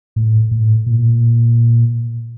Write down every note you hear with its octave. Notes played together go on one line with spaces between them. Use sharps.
A2
A2
A#2